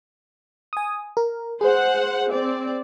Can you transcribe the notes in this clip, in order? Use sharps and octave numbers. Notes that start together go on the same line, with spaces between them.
G#5 D#6
A#4
G#4 C5 F#5
C4 D5